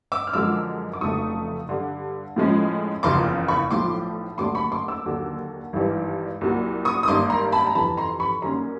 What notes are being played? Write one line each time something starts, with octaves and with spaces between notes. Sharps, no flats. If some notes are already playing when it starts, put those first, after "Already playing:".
D6 E6
F6
F#2 D3 F3 G#3 D6 E6
D6
F1 F2 C#3 F#3 A3 C#6 D#6
G2 D3 G3
A2 F3 G#3 C#4
F#1 E2 C#3 F3 C6 D6
B5 C#6
B1 A2 F3 C6 D6
D#2 D3 F#3 A3 D4 C6 D6
B5 C#6
C6 D6
D6 E6
D#2 D3 F#3
G#1 G2 E3 G3
C2 A#2 F#3
C#6 D#6
D#6
G#1 G2 D#3 G3 A#3 C6 D6
A#5 C6
A5 B5
A#5
F2 C3 E3 A5 B5
A#5 C6
B5 C#6
F#2 D#3 G3 A#3 C#4 A#5 C6